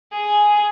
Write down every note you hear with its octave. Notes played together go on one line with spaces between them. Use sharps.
G#4